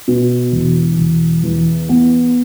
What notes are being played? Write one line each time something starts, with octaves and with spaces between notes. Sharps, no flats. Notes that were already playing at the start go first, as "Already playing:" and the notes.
B2
E1
E1
E2
B3